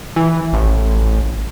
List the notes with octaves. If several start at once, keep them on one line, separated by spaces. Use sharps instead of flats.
E3
A1